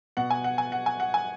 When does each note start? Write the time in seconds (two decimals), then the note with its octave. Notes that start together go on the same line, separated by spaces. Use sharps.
0.17 B2 F#5
0.30 G#5
0.44 F#5
0.58 G#5
0.72 F#5
0.86 G#5
1.00 F#5
1.14 G#5